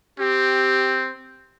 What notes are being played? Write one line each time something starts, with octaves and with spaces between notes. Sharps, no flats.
C4 G4